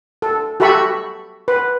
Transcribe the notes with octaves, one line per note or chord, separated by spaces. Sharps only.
A4
F#4 G4 A4 E5 B5 C#6
B4